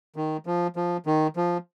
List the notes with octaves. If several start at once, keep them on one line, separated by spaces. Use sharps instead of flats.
D#3
F3
F3
D#3
F3